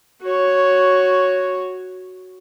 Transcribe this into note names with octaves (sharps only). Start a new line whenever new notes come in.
F#4 C#5